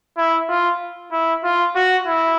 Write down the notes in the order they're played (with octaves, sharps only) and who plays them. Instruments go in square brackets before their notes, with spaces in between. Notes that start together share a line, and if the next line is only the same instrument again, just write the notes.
[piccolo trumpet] E4
F4
E4
F4
F#4
E4